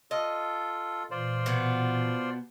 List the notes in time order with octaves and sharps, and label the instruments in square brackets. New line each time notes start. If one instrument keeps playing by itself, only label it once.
[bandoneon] F4 A4 [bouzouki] D#5
[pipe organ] A#2 E3 [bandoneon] F4 C5 D5
[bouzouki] B2 B3